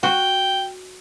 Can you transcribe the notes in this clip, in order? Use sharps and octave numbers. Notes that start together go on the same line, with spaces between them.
F#4 G5